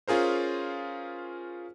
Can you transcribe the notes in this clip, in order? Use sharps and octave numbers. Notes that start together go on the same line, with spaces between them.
C#4 F4 G#4 A#4 C5